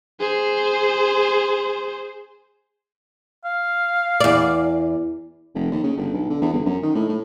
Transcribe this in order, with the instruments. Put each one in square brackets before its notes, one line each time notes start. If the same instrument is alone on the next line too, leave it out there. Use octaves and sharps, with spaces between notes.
[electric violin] G#4 C5
[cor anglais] F5
[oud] E2 D5
[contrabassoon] F1
D#2
C#3
G1
B1
D3
E2
G1
F#2
D#3
A2
A2